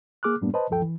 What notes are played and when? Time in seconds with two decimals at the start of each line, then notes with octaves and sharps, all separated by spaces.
0.23 A#3 G#4 D6 F6 F#6
0.41 F#2 A2 G3 A#3 B3 D4
0.54 B4 C5 D#5 A5
0.70 D2 G2 F3 A4 G5
0.82 E3